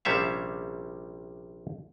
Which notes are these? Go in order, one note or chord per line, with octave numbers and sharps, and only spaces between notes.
A#1 C3 G3 C#4 E5 F5